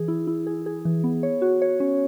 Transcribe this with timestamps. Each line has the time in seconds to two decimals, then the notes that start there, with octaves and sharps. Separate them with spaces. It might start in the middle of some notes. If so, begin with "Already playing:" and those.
Already playing: E3 G#4
0.08 E4
0.27 E4
0.47 G#4
0.66 G#4
0.85 E3
1.04 B3
1.23 C#5
1.42 F#4
1.62 C#5
1.80 C#4